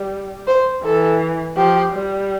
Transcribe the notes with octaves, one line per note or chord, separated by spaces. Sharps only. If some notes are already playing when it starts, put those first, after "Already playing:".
Already playing: G3
C5
E3 A4
F3 G4
G3